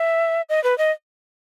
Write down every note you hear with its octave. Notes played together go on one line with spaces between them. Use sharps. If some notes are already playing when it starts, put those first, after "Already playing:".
Already playing: E5
D#5
B4
D#5